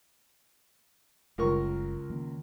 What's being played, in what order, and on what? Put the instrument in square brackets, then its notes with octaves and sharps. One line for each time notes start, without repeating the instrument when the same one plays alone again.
[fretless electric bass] F#1 G3 [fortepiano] C#2 A#4 C#6
[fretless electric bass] D#3 A#3 C#4